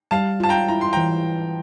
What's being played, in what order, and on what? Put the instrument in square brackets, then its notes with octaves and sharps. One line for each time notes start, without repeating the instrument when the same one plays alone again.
[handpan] G3 [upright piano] F5 A5
[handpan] F4 [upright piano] A5
[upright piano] G5 A#5
[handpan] E4 [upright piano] A#5
[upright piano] C6
[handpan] E3 [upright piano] G5 A#5